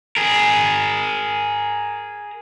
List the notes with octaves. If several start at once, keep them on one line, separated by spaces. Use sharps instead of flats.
G#4 A#4